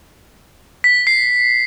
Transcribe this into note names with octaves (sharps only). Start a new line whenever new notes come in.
B6
C7